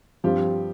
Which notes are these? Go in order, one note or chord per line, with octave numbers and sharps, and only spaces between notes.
G2 F3 C4 F4 G4